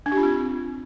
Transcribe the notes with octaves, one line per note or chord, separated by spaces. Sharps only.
D4
G4
F4
C4